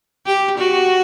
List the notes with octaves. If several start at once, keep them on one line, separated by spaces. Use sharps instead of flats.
G4
F#4